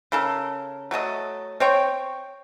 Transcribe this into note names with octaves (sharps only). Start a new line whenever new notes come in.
C#3 A4 A#4
F#3 A3 A4 D#5
C4 C#5 G5 C#6